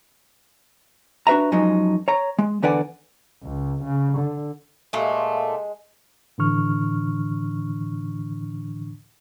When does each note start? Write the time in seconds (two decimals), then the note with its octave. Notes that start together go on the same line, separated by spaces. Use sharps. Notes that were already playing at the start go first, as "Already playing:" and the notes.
1.27 D4 F#4 B4 E5 A#5
1.52 F#2 F3 F#3 G#3 D#4
2.08 C#5 A#5
2.39 G#3
2.62 E2 D3 B4 D5 F#5 G#5
3.43 C#2
3.84 C#3
4.18 D3
4.93 A#2 G#3 A3 E5 F5
6.38 A2 D3 E3 D4 C#6 F6